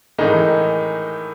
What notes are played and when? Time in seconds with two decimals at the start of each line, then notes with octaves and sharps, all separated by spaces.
0.18 A2 D#3 E3 G#3 D#4